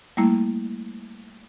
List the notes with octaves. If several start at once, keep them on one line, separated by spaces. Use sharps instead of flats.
G3 A3 A#3 E4